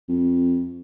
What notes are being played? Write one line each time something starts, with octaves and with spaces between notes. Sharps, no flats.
F2